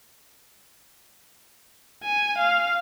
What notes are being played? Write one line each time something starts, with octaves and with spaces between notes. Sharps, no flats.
G#5
F5